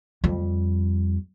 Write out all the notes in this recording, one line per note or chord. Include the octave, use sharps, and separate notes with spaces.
F2 G3